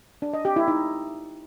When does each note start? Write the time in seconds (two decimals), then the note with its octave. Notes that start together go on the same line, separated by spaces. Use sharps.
0.22 D4
0.34 D#5
0.45 G4
0.56 E4
0.68 D#4